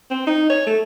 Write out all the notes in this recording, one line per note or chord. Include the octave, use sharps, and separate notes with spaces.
C4
D#4
C#5
A3